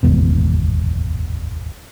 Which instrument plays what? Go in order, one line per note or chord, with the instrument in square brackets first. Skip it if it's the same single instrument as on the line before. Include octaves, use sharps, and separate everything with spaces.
[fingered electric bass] D1 G#1 E2 B2